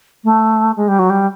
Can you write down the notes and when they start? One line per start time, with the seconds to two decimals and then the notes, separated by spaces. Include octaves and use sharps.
0.24 A3
0.76 G#3
0.88 G3
0.99 F#3
1.10 G3